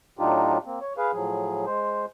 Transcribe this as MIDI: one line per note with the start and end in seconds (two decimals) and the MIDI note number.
0.19 0.58 45
0.19 0.58 54
0.19 0.58 62
0.19 0.58 63
0.19 0.58 65
0.19 0.58 67
0.65 0.79 58
0.65 0.79 60
0.81 0.93 73
0.98 1.12 68
0.98 1.12 71
0.98 1.12 77
1.13 1.65 45
1.13 1.65 53
1.13 1.65 54
1.13 1.65 68
1.66 2.05 56
1.66 2.05 72